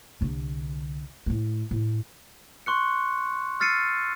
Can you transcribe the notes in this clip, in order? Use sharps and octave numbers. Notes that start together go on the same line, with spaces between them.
C2 D3
A2 A3
A2
C6 C#6 F#6 C#7
E6 F6 A6 C7 C#7 D#7